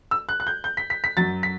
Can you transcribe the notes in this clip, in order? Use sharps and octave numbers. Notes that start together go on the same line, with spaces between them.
E6
F#6
F#6
G6
G6
B6
B6
B6
F#2 F#3 A6
B6